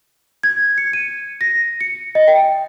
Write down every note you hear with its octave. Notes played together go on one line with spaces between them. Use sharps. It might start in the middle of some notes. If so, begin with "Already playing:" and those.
G#6
C#7
D#7
A#6
C#7
D#5
G5